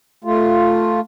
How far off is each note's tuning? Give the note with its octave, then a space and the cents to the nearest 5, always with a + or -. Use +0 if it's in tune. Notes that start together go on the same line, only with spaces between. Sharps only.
A3 +0 F4 +0